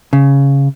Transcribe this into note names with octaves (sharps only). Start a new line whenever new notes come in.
C#3